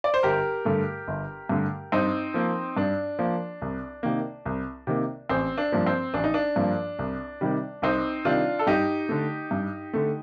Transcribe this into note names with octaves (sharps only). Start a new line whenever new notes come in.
D5
C5
G1 G4 A#4
G2 D3 A3
G1
G2 D3 A3
G2 C4 D#4
F3 A#3
G2 D4
F3 A#3
C2
C3 D#3 A#3
C2
C3 D#3 A#3
A1 C4
D4
G2 F3 A#3
C4
A1 D4
D#4
D4
G2 F3 A#3
C2
C3 D#3 G3
C2 C4 D#4
C3 D#3 G3 D4 F4
A4
G2 D#4 G4
D3 A3
G2
D3 A3